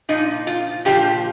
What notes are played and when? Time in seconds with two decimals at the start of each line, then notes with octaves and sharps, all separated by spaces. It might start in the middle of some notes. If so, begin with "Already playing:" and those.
0.09 A#2 F3 D#4
0.47 F4
0.85 A#2 F3 G4